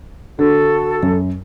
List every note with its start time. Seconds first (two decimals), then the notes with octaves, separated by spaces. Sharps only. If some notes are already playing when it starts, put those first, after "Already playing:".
0.39 D3 F#4 A4
1.03 F#2